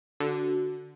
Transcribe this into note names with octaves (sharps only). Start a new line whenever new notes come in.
D3 F#4